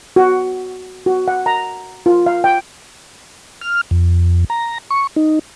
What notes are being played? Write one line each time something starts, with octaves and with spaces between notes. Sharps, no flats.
F#4
F#4
F#5
A#5
F4
F5
G5
F6
F2
A#5
C#6
D#4